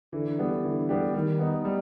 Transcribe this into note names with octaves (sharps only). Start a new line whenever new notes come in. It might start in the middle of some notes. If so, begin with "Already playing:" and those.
D3 E3
G3 B3 D4 G4
D3 E3
G3 B3 D4 G4
D#3 G3
B3 D#4
G3